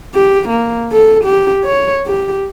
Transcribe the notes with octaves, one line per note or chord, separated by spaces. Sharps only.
G4
A#3
A4
G4
C#5
G4